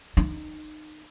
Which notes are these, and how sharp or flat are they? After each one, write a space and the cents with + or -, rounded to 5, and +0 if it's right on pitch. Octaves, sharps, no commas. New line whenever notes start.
D#4 -25